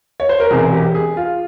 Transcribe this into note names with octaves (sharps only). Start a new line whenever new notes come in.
C#5
C5
A#4
E1 E2 C3 G#4
G4
G#4
F4